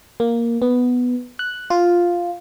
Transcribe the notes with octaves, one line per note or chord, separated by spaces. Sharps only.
A#3
B3
F#6
F4